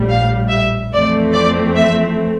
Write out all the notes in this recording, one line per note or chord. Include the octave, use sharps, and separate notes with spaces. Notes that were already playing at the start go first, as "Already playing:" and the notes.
Already playing: A#1 A2 G3
F5
E5
F2 E3 A3 C4 D5
D5
E5